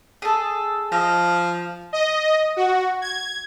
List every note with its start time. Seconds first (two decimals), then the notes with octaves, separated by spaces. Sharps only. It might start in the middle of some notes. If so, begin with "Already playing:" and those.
0.22 G#4 A4
0.92 F3 D#5
1.93 D#5
2.57 F#4
3.02 G#6